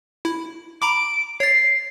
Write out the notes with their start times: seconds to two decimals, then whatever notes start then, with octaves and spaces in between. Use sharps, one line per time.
0.25 E4
0.82 A#5 B5 D6 D7
1.40 C#5 A6 C7